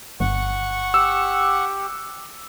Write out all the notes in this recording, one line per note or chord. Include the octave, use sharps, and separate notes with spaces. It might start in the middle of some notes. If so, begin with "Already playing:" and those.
G1 F#5 C#6
G4 E6